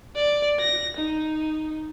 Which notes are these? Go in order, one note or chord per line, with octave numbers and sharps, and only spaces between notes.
D5
A#6
D#4